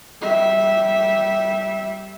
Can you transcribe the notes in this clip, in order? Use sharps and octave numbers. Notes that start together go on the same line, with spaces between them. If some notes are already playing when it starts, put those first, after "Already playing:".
G3 E5